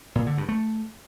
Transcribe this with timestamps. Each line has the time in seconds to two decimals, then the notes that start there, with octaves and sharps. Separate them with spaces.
0.15 A#2
0.26 D3
0.38 G2
0.49 A3